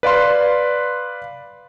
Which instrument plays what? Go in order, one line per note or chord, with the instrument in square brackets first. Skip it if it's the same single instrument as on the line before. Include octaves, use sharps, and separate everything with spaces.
[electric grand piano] B4 D5 F5 C6